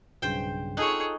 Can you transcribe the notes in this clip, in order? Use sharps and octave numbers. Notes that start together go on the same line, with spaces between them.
B1 G2 C#3 C5 G5
D#4 F4 G#4 A4 C#5 F#6